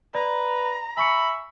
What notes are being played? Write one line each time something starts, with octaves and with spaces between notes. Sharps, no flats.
B4 D5 A#5
E5 G#5 B5 C#6 C#7